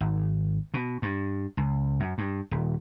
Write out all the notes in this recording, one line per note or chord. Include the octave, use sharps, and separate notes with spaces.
G#1
B2
G2
C#2
F#2
G2
D#1